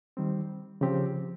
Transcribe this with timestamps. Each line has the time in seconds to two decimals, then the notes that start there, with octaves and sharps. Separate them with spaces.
0.17 D#3 G3 C4
0.81 C#3 F3 C4 G4